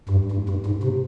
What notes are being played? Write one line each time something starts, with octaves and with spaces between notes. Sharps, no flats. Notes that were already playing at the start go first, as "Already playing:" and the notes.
G2
G2
G2
G#2
C3